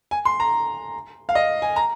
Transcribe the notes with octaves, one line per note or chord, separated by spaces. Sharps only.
G#5
C6
A#5
F5
D#5
G#5
A#5